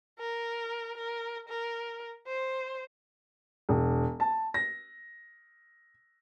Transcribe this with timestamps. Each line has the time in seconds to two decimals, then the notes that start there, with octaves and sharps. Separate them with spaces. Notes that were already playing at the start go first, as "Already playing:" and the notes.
0.19 A#4
0.98 A#4
1.49 A#4
2.27 C5
3.69 E1
4.20 A5
4.54 A#6